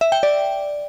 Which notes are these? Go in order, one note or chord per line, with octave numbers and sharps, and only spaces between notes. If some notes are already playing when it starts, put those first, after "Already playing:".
E5
G5
D5